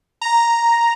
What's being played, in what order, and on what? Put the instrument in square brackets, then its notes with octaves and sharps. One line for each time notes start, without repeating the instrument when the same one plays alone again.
[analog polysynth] A#5